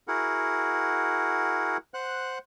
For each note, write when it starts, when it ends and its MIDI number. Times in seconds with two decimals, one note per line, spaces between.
0.08 1.77 64
0.08 1.77 66
0.08 1.77 68
0.08 1.77 70
0.08 1.77 78
1.94 2.38 72
1.94 2.38 78
1.94 2.38 90